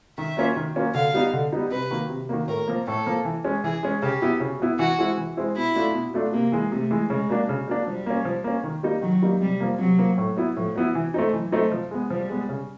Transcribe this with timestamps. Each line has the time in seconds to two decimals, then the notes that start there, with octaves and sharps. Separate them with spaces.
0.18 D#3 E5
0.37 F#3 A#3 C#4 F4
0.56 D#3
0.75 F#3 A#3 C#4 F4
0.94 D3 F5
1.14 G3 B3 D#4
1.33 D3
1.53 G3 B3 D#4
1.71 C3 B4
1.91 D#3 F#3 A#3
2.10 C3
2.29 D#3 F#3 A#3
2.48 A2 A#4
2.68 F3 A#3
2.87 A2 A4
3.06 F3 A#3
3.25 E3
3.45 G#3 C#4
3.64 E3 G#4
3.83 G#3 C#4
4.02 C#3 G4
4.22 F#3 B3 E4
4.40 C#3
4.60 F#3 B3 E4
4.79 E3 F#4
4.98 G#3 C4 E4
5.17 E3
5.37 G#3 C4 E4
5.56 B2 E4
5.76 F#3 A3 D4 F4
5.94 B2
6.14 F#3 A3 D4 F4
6.33 C3 A#3
6.52 E3 G#3
6.72 C3 A3
6.91 E3 G#3
7.10 C#3 G#3
7.29 F#3 A#3 D4
7.49 C#3
7.68 F#3 A#3 D4
7.87 F3 G3
8.06 A#3 C#4
8.25 F3
8.44 A#3 C#4
8.64 D#3
8.83 G3 A#3 D#4
9.02 D#3 F#3
9.22 G3 A#3 D#4
9.41 C3 G3
9.60 F3 A#3
9.79 C3 F#3
9.98 F3 A#3
10.18 A2
10.37 F#3 B3 E4
10.56 A2 F3
10.76 F#3 B3 E4
10.95 E3
11.14 A3 C4 D#4
11.33 E3 F#3
11.52 A3 C4 D#4
11.72 F3
11.91 G#3 B3
12.10 F3 G3
12.29 G#3 B3
12.49 C#3